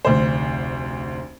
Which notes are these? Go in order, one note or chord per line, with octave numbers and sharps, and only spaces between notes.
F1 D2 C5